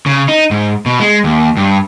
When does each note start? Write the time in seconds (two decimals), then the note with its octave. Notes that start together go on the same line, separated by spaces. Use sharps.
0.06 C#3
0.28 D#4
0.51 G#2
0.86 B2
1.00 G#3
1.24 D#2
1.57 G2